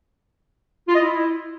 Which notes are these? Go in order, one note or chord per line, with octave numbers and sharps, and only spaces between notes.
F4
D#5
E4